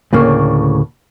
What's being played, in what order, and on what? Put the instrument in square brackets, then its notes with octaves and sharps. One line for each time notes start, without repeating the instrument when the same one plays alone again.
[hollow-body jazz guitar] D2 A2 C#3 A#3